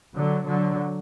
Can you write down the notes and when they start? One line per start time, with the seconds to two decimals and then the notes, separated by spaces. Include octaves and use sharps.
0.16 D3 F#3
0.47 D3 F#3